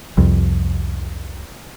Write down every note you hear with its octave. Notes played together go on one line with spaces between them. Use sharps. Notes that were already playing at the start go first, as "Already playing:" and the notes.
C2 F2